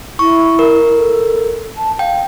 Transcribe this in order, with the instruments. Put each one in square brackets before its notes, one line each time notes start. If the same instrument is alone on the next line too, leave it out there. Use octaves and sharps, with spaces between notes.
[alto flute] E4 [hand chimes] C#6
[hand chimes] A#4
[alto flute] A4
A5
[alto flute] F5 [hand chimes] G5